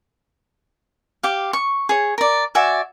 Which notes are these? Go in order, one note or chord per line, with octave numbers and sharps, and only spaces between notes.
G4 F5
C#6
G#4 C#5
A#4 D5
F#4 D5 E5 G#5